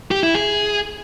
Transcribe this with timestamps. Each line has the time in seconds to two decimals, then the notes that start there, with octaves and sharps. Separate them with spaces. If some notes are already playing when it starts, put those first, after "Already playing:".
0.11 G4
0.23 E4
0.35 G#4